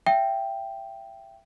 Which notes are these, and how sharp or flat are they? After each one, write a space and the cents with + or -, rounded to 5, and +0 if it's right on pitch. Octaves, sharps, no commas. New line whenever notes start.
E5 +25 G5 +0